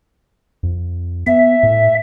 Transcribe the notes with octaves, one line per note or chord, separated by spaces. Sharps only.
F2
B3 E5
A2